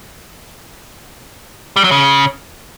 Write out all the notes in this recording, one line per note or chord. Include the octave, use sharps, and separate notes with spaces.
G3
F#3
C#3